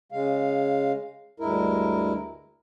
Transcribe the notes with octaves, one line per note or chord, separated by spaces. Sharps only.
C#3 G#3 F5
D2 G2 G#3 E4 A#4